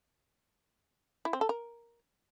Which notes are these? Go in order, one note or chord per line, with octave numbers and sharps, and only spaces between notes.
E4
C4
A4
A#4